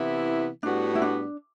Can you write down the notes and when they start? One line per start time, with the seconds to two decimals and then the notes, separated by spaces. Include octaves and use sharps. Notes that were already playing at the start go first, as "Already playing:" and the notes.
Already playing: C3 E3 B3 E4
0.63 A2 G3 B3 D4 F#4
0.95 E4
1.02 D4